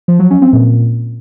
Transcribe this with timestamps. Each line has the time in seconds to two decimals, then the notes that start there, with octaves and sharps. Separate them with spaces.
0.08 F3
0.19 F#3
0.30 C#4
0.42 C4
0.53 A#2